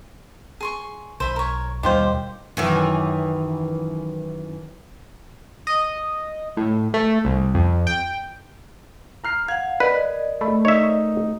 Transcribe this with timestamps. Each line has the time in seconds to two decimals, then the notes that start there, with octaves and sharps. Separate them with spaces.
0.61 G#4 C6 C#6
1.20 B1 C5 E5 B5
1.36 A#4 C#5
1.83 D#2 B2 D#3 G3 F4 G4 C5
2.57 F#2 D#3 E3
5.67 D#5
6.57 A2
6.94 A3
7.25 C2
7.55 F2
7.87 G5
9.24 A#5 F6 C7
9.48 F5 F#5 G#6
9.80 A#4 B4 D5 D#5
10.41 A3 B5
10.65 D#4 C#5 E5